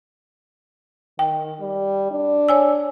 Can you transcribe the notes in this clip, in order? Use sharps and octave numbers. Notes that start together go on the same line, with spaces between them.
D#3 G5
G3
D4
C#5 G#5 E6